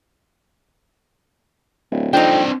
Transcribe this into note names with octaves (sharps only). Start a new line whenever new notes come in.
D1
F2 C4 D4 D#4 G5